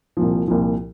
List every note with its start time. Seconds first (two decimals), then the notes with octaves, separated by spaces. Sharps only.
0.17 C2 A#2 F3
0.48 C2 A#2 F3